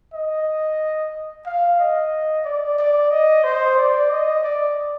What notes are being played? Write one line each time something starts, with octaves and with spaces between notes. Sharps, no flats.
D#5
F5
D#5
D5
D5
D#5
C5
D5
D#5
D5